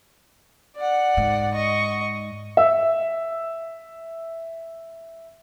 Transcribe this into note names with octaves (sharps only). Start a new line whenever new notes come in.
D5 F#5
G#2
D#5 C#6
E5 E6